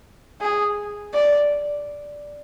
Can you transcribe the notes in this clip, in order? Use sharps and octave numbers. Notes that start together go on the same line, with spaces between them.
G#4
D5